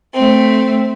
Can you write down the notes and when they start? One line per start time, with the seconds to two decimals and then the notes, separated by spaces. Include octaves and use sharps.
0.14 A3 C4